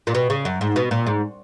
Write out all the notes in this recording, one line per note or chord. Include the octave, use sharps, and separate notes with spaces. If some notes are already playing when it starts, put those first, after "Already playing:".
A#2
B2
C#3
F#2
G#2
B2
A#2
G#2